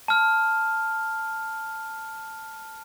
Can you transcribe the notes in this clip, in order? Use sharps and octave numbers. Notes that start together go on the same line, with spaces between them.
A5 F6